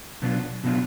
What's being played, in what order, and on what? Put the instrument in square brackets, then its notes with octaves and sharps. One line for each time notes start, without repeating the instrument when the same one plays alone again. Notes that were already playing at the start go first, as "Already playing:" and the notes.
[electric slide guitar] B2 F#3 B3 D4 F4
B2 F#3 B3 D4 F4